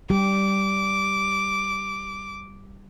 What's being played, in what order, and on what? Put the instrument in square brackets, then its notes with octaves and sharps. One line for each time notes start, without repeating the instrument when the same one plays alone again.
[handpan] G3 G4 [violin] D6